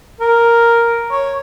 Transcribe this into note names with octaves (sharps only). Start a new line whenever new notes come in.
A#4
C#5